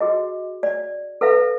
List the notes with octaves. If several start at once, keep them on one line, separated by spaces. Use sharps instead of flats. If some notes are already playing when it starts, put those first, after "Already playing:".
F#4 G#4 D#5
D5
A4 B4 E5 F5